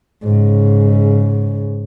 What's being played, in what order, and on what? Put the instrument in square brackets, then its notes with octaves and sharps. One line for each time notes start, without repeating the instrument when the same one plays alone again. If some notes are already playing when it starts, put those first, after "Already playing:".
[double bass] G#2 C#3